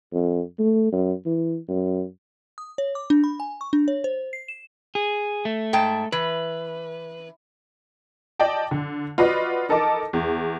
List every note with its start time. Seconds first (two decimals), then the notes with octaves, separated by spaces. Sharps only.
0.13 F2
0.59 A3
0.92 F#2
1.26 E3
1.68 F#2
2.58 D#6
2.78 C#5
2.95 D6
3.10 D4
3.24 B5
3.40 G#5
3.61 C#6
3.73 D4
3.88 C#5
4.04 C5
4.33 C7
4.48 E7
4.95 G#4
5.45 A3
5.73 G#2 G5 A5
6.12 E3 B4
8.39 D5 D#5 G5 A5
8.71 D3
9.18 F4 F#4 B4 D5 D#5
9.69 D#4 A4 A#4 D#5 A5 D6
10.13 E2